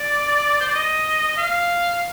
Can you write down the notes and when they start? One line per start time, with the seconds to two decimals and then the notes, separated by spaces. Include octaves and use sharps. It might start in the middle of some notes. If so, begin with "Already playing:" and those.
Already playing: D5
0.60 C5
0.67 D5
0.75 D#5
1.28 D#5
1.38 F5